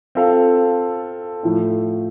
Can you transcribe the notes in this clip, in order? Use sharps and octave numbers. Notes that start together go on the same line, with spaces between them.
C4 F4 A4 F5
A2 F3 A3